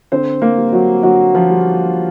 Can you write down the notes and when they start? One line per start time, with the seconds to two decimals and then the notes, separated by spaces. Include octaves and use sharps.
0.12 D3 C4 C5
0.42 A#3 A#4
0.58 G3
0.72 F#3 F#4
1.03 D3 F#3 F#4
1.35 F3 F4
1.50 G3